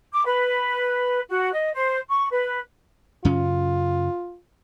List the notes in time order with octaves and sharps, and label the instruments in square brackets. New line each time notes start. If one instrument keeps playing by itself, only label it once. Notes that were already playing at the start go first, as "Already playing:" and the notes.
[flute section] D6
B4
F#4
D#5
C5
C#6
B4
[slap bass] F#2 C#3 C#4 [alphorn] F4